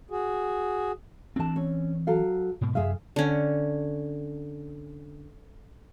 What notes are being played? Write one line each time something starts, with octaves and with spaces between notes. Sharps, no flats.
F#4 G#4
E3 C4 D4 A5
C#4
F#3 A4 F5
G#2 B2
F#2 C3 F#3 G#4 E5 F5
D3 C#4